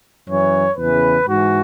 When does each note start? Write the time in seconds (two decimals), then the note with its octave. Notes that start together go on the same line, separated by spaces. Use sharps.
0.26 F#2 E3 C#5
0.77 E2 C#3 E3 B4
1.27 G#2 E3 F#4